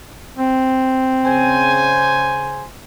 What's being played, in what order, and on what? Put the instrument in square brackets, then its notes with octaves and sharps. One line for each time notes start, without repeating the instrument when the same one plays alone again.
[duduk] C4
[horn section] C#3 C5 G#5